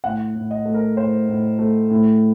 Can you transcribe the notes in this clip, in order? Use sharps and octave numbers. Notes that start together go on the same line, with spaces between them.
A2 F#5
A2
D#5
A3
A#4
A2 C5
A2
A3
A2